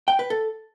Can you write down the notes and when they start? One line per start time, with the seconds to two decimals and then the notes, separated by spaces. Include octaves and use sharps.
0.08 G5
0.19 B4
0.30 A4